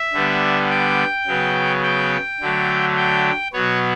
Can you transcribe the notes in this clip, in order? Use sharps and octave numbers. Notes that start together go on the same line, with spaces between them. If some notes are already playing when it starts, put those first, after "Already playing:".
Already playing: E5
D3 G3 B3
G5
C#3 F#3 B3
G5
D3 F#3 A3
G5
B2 F#3 B3 C#5